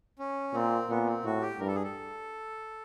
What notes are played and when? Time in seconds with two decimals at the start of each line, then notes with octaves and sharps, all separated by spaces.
0.19 C#4
0.54 A#2 C4
0.89 A#2 B3
1.07 C4
1.25 A2 F#4
1.42 G4
1.59 G2 A#4
1.68 A4
1.75 G#4
1.84 A4